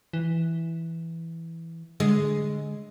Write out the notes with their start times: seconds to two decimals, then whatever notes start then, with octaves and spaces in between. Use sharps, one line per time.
0.13 E3
2.00 D3 G#3